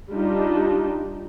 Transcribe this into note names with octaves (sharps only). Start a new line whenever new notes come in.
G3 D4 D#4 F4 G4